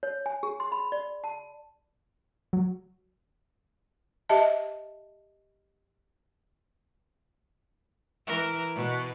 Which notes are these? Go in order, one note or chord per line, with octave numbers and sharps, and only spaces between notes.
C#5
G#5
G#4
C6
B5
D5
A5
F#3
G4 D#5 E5 A5
E3 A#4
B2